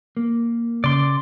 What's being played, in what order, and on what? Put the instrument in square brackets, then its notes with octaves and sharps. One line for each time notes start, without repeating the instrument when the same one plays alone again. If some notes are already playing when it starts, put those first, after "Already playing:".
[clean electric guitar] A#3
[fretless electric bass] C#3 [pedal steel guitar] D5 C6